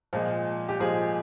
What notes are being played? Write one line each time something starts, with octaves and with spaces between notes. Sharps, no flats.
A#2 F3 G#3
G4
A#2 F3 G#3 G#4